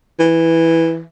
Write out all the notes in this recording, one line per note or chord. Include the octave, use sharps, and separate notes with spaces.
E3